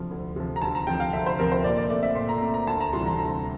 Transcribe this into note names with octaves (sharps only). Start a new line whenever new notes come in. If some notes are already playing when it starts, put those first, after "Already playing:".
Already playing: D2 C3 F3
D2
C3 F3
A#5
D2 A5
A#5
C3 F3 C4 G5
F5
D2 E5
C5
C3 F3 C4 A#4
C5
A#2 D5
D5
A3 C4 D5
E5
A#2 C6
A#5
A3 C4 A#5
A#5
D2 A5
A#5
C3 E3 G3 C6
A#5
D2 A#5